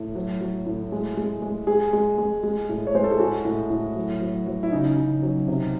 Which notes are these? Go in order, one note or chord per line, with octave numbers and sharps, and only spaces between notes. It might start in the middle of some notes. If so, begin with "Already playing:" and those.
Already playing: A2
F#3
F#3
A2
G#3
G#3
G#3
G#3 G#4
G#3
G#3
G#3
A2
C#5
G#3 C5
A4
G#4
A2 F#4
A2
A2
F#3
F#3
F#3
E4
C#3 D#4
C#3
F#3
C3